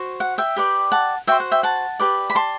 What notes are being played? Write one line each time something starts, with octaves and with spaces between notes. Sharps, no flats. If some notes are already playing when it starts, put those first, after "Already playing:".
Already playing: F#4 C5
F#5
E5 G5
G4 B4 D5
F#5 A5
F#4 C5 E5 G5
F#5
E5 G5
F#5 A5
G4 B4 D5
B5
A5 C6